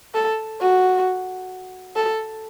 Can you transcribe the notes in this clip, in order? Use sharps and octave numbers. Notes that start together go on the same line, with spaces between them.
A4
F#4
A4